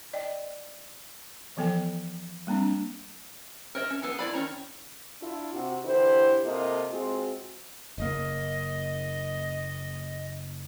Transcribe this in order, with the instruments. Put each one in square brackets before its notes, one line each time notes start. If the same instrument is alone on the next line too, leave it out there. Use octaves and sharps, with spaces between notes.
[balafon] D5 D#5 G5
E3 F3 B3 A4 G5
G3 A#3 C4 D4
[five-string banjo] A#4 C#5 D#5 E5
C#4
B3 G#4 A4
E4 D5 B5
D#3 C#4 A#5
[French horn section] D4 E4 F4
C3 F#4
D3 E3 E4 G4 C5
C3 A#3 F4 A4 D#5
G#3 C4 F4 F#4
[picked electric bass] F#1 A#3 [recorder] D#5